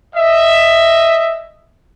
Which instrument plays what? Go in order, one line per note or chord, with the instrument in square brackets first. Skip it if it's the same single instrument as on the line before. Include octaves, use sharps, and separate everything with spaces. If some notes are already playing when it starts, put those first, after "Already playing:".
[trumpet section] D#5 E5